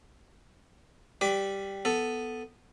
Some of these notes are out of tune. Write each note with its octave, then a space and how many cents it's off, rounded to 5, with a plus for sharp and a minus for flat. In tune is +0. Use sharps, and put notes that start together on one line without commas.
G3 +0 B4 +25 D6 +0
B3 +0 A4 +0